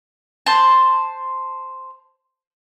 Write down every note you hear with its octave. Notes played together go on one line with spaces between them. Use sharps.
C5 A5